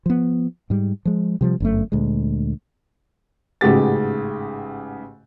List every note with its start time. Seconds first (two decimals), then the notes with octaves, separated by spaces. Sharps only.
0.06 F3 B3
0.70 G#2 G3
1.05 F3 G#3
1.41 C3 F3 G3
1.60 G1 F#2 A3
1.92 D2 A#2 G#3
3.61 A1 G#2 C#3 F#4 G4 A6